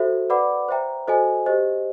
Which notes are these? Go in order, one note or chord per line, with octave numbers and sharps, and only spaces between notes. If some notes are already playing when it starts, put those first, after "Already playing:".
Already playing: F#4 A4 C5 E5
B4 D5 F#5 B5 D6
C5 E5 G5 A#5
F#4 A4 C5 D#5 G#5
G4 C5 D#5